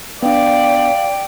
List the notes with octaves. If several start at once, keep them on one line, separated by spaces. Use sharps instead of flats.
B3 D4 D5 F5 G5